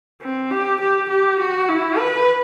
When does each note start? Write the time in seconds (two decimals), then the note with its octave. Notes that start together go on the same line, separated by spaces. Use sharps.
0.22 C4
0.51 G4
0.80 G4
1.09 G4
1.39 F#4
1.69 E4
1.98 B4